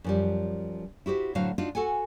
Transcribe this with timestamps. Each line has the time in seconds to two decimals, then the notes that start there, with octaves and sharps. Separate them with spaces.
0.04 F#2 F3 G3
1.06 E4 F#4 G4 C5
1.35 A2 D3 F#3 F#4 C5 F5
1.58 D4 D#4 F4 F#4
1.75 F#4 A4 F#5 G#5